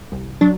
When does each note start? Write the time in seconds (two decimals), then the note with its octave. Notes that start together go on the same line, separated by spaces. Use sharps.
0.12 C2
0.41 F#3 D4